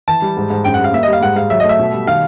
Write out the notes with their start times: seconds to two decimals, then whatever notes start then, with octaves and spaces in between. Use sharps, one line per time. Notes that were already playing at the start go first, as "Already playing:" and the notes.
0.08 E3 A5
0.22 G3
0.37 G#2
0.50 G#2
0.64 F#2 G5
0.74 F#5
0.79 G3 F5
0.93 A#3 E5
1.03 D#5
1.08 G3
1.13 F5
1.21 G#2 F#5
1.36 G#2 F5
1.50 F#3 E5
1.60 D#5
1.64 A3
1.69 E5
1.79 B2
1.93 G3
2.07 D#3 F5